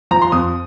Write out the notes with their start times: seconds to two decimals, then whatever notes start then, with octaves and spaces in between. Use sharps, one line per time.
0.11 F3 A#5
0.22 C6
0.32 F2 D#6